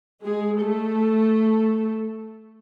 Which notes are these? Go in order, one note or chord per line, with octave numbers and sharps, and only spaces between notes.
G#3 G#4
A3 A4